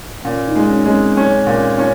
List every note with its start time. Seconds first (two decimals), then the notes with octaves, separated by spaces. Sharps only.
0.25 A#2 C#4
0.48 D#4
0.55 G#3
0.70 C#4
0.86 G#3 C#4
0.93 C4
1.17 C#4
1.47 A#2
1.78 C#4